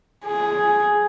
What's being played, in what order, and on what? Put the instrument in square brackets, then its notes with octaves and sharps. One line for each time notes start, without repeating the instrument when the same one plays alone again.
[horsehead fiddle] G#4